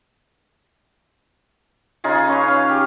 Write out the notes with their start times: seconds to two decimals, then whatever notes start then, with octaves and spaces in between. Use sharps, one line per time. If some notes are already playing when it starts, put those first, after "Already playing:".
2.04 C#3 D#4 F4 G#4
2.28 C#4 B4 C#5
2.48 F5
2.69 G4